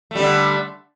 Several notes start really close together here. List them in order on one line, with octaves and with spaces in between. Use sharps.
A3 G3 D3